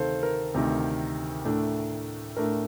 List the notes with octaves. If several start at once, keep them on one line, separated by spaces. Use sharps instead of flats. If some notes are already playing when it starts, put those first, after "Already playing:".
Already playing: D2 C3 D#3 A4 C5 F5
A#4
D2 C3 D#3
A2 A3 D4
A2 A3 D4 A#4